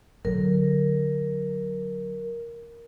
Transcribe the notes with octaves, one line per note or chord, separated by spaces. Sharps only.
D3 F#3 A#4